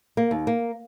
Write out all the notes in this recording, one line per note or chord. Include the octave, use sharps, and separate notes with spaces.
A#3
D#2
A#3